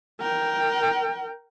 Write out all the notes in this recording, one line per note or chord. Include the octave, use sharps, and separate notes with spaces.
A#4 G5